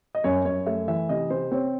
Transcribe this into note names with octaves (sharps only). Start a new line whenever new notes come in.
D#5
F#2 C#5
F#2 C#5
A3 E5
E3 E5
C3 D#5
C3 C5
C4 C#5